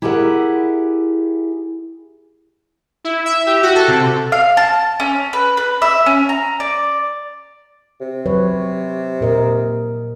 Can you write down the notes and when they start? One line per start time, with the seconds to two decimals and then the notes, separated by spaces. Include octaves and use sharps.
0.02 E4 G4 G#4 A#4 E5 F#5
3.04 E4
3.26 E5
3.46 G4
3.63 F#4
3.75 A4
3.88 C3
4.32 F5
4.57 A5
5.00 C#4
5.33 B4
5.57 B4
5.82 E5
6.06 C#4
6.29 A#5
6.60 D5
8.01 C3
8.26 F#3 B4 C#5
9.21 A#2 A#4 D#5